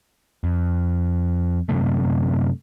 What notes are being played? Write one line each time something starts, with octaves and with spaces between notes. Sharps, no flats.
F2
F#2 C3 A3